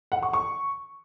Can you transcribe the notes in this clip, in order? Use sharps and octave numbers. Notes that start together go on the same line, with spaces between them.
F#5
C#6
C#6